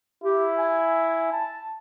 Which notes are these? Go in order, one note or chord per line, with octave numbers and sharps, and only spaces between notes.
E4 G4
G#5
A5